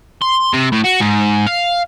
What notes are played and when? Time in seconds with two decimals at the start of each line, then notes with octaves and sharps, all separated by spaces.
0.22 C6
0.53 C3
0.72 A2
0.84 F#4
1.00 G#2
1.47 F5